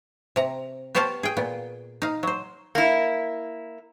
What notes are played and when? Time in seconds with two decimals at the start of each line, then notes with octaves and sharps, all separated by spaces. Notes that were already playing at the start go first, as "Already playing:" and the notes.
0.36 C3 A#5
0.95 B3 G4 C5 C#5 F5 A5
1.23 G#4 G5
1.37 A#2 B3
2.02 D#4 F5
2.23 F#3 C5
2.75 A#3 E4